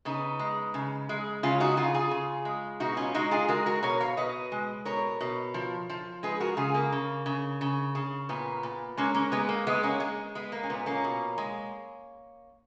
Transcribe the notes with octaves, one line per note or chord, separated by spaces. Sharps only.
C#3 B3 D#4
G#3
C#3
G#3
C#3 C#4 F4
D#4 F#4
C#3 F4 G#4
F4 G#4
C#3
G#3
B2 D#4 F#4
C#4 F4
G#3 D#4 F#4
F4 G#4
G#3 F#4 A#4
F#4 A#4
B2 A#4 C#5
C#5 F5
B2 B4 D#5
G#3
B2 A#4 C#5
B2
F3
F3
G#3 G#4 B4
F#4 A#4
C#3 F4 G#4
A#3
C#3
C#3
C#3
C#3
A#2 B3
A#2
G#3 A#3 C#4
A#3 C#4
G#3 B3
A#3
G#3 B3
A#3 C#4
G#3
G#3 B3
A#3
C#4
A#2 B3
A#3 C#4
B2
G#3